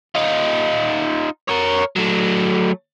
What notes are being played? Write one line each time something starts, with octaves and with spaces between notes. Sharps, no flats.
D#4 F4
A#4 C#5
F#3 A3